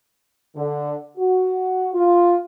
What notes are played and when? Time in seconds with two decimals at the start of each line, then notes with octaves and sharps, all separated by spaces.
0.55 D3
1.17 F#4
1.94 F4